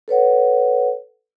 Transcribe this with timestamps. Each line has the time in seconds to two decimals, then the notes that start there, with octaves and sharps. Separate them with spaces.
0.08 A4 B4 C#5 F#5